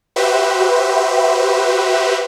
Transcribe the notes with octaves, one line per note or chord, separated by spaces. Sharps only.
F#4 G4 B4 C5 E5